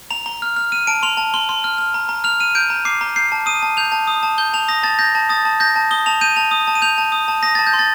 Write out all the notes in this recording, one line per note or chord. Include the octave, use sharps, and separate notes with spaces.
A#5 F7
A#5
F6
F6
F6 D#7
A5 D7
C6 F7
A5
C6 G7
C6
F6
F6
A#5
A#5
F6 F7
F6 D#7
G6 D7
A#5
D6 C7
A#5
G6 C7
A5
D#6 D#7
A5
G6 F7
A5
D#6
A5
G6 G7
A5 F7
D#6 A#6
A5 A6
G6 A#6
A5
D#6 A6
A5
G6 A#6
A5
D#6 G7
A5 F7
G6 D#7
A5 F7
D#6
A5
D#7
G6 F7
A5
D#6
A5
D#6 A#6
A5 A6
G6
C6
A6